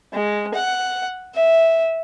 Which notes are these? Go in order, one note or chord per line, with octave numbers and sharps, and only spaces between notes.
G#3
F#5
E5